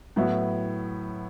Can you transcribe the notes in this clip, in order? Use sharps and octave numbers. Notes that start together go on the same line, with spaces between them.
A2 F#3 B3 E4